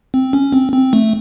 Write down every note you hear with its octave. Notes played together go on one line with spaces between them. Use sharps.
C4
C#4
C4
C4
A3